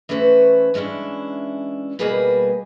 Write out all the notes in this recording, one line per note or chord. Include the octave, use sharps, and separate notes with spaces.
E3 A3 C#4 B4 C5
E3 G#3 C#4 D4 E4
B2 G3 A#3 F#4 G#4 B4